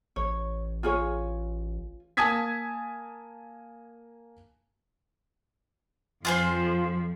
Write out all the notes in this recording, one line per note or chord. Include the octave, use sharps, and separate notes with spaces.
A1 C#5
F4 G#4 C#5
A#3 G#5 A5 D#6 G#6 B6
F2 F3 F4 G#4 C5